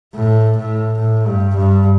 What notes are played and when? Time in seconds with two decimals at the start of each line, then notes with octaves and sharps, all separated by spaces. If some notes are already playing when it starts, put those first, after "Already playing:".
0.14 A2
0.57 A2
0.98 A2
1.27 G2
1.56 G2